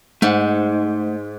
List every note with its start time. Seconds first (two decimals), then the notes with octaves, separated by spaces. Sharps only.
0.22 G#2 A3 C5 F#5